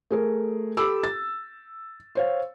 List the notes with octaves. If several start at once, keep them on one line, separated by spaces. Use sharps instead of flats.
A3 G#4 A#4
G4 A4 B5 D6 E6
A6
C5 C#5 F5